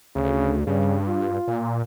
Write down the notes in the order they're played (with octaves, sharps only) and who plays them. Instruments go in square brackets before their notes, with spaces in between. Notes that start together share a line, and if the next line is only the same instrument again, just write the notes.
[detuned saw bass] D2 [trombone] C#3
[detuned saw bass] G2 [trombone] C#3
[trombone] F4
[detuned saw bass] A#2